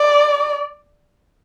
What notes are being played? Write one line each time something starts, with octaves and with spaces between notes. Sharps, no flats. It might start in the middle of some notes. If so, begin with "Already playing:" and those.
Already playing: D5